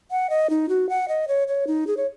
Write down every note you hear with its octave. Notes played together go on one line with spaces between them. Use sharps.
F#5
D#5
D#4
F#4
F#5
D#5
C#5
C#5
D#4
G#4
C#5